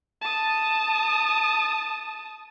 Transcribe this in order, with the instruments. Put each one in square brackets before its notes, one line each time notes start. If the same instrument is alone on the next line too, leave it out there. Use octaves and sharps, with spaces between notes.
[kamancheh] A5 D#6